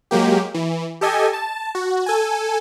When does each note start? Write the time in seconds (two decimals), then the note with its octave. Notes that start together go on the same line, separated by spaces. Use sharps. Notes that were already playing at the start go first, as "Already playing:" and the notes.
0.11 F#3 G#3 A#3 G4
0.54 E3
1.01 G4 A4 D#5 G#5
1.33 A5
1.75 F#4
2.06 A4 G#5